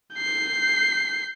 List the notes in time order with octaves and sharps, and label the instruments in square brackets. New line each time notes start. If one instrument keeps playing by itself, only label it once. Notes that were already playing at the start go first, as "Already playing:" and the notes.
[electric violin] G6 C7